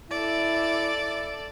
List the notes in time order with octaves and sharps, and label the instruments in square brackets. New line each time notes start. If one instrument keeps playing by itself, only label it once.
[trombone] E4 [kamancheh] A4 D5